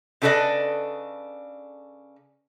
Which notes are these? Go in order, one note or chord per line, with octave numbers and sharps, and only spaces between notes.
C#3 D4 A4 B4 D5 D#5